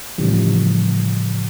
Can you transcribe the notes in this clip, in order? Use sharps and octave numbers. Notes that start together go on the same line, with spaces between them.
A2 C#3 E3 F3 G3